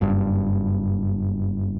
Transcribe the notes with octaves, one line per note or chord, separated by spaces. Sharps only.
F#1 G2